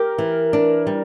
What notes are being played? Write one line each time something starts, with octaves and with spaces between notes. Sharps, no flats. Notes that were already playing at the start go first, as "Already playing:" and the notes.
Already playing: G4 A#4
E3
D4
G3